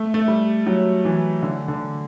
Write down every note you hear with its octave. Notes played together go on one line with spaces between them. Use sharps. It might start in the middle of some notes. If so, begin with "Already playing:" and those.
Already playing: A3
A3
G3
F#3
E3
D3
D3